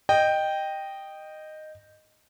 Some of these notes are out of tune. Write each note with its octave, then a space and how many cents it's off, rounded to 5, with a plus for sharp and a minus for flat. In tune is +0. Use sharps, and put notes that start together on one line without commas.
D#5 -10 G5 +0